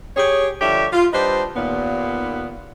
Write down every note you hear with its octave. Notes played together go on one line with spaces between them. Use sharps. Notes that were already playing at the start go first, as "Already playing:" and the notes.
G4 G#4 C#5
D3 F3 G3 G4 C#5 E5
F4
G3 D4 B4 C5 D#5
D#2 A#2 B3